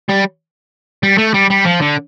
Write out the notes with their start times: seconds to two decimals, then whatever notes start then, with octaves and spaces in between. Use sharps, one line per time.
0.09 G3
1.03 G3
1.18 A3
1.34 G3
1.50 G3
1.65 F3
1.81 D3